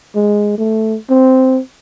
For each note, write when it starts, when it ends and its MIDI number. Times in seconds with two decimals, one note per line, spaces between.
0.15 0.56 56
0.58 0.97 57
1.10 1.60 60